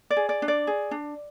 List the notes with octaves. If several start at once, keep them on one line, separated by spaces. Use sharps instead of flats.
D5
G#4
D5
D4
D5
G#4
D4